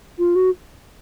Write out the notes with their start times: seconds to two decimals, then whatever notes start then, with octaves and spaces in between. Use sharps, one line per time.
0.19 F4
0.35 F#4